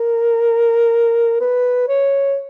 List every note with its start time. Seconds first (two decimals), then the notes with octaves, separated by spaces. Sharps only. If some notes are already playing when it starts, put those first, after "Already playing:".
Already playing: A#4
1.41 B4
1.88 C#5